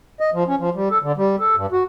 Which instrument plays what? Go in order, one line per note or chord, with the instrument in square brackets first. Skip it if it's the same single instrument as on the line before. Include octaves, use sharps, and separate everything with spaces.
[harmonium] D#5
F3
C#4
F3
G3
A4
D3
G3
A4
G2
F#4